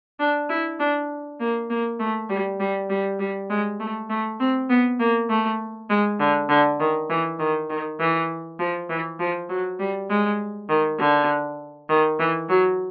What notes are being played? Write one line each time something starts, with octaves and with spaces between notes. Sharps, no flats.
D4
E4
D4
A#3
A#3
A3
G3
G3
G3
G3
G#3
A3
A3
C4
B3
A#3
A3
G#3
D3
D3
D#3
E3
D#3
D#3
E3
F3
E3
F3
F#3
G3
G#3
D#3
D3
D#3
E3
F#3